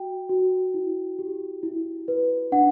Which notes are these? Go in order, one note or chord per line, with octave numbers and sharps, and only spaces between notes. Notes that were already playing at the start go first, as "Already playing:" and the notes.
Already playing: F#4 G5
F#4
E4
G4
E4
B4
D4 F#5